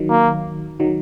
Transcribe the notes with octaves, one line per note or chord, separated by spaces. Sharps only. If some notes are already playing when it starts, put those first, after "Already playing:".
Already playing: D#3 F#3
A#3
D#3 F#3